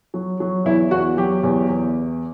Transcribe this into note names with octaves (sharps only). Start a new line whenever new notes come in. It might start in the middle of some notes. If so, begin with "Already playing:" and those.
F#3
F#3
E2 E4
E2 F#4
F#3 G4
E2
E2